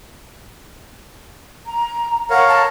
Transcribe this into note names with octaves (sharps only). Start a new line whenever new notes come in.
A#5
A#4 C#5 F5 F#5
A5